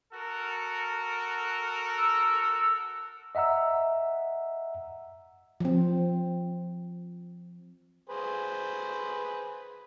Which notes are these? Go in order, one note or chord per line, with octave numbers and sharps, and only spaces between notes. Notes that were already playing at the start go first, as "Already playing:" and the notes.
F#4 A4 A#4
E6
D#5 E5 F#5 A#5 E6
F3 C4
G#4 B4 C5